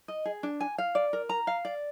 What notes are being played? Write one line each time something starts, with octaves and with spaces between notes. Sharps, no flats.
D#5
G#4
D4
G#5
F5
D5
A#4
A#5
F5
D5